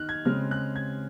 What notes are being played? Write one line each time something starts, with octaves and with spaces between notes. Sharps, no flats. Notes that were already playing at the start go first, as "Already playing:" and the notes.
Already playing: D#3 D#4 F6 F#6
G#6
C#3 G#3 C4 F6
F#6
G#6